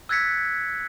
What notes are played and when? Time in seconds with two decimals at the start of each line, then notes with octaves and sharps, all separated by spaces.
0.09 E6 F#6 G#6 A6 B6 C#7